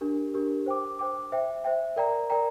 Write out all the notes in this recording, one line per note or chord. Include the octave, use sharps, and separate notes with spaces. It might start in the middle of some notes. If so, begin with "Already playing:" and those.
D4 G4 A#4
D4 G4 A#4
C5 G5 D6
C5 G5 D6
C5 E5 G5
C5 E5 G5
A#4 D5 G5 A#5
A#4 D5 G5 A#5